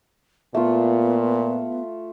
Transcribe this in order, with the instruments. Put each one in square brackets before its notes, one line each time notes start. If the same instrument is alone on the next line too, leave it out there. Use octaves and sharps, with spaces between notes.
[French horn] A#2 [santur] A3 F4 [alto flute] B3